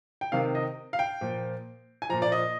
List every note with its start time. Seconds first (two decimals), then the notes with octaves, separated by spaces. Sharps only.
0.21 G5
0.32 C3 D#3 F5
0.55 D#5
0.93 F5
0.99 G5
1.21 A#2 F3
2.02 G#5
2.09 F3 A#5
2.13 A#2
2.22 D5
2.32 D#5